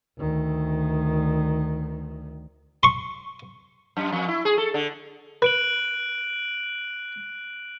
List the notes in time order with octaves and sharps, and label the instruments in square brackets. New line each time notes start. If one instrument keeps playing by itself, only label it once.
[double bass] D2 D#3
[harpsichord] C6 C#6
[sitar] F#2
F2
E4
G#4
A4
D3
[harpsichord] B4 [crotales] F#6 D7 F#7